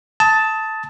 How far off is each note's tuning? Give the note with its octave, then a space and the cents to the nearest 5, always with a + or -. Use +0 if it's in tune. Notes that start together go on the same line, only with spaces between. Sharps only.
A5 +0 D#6 +30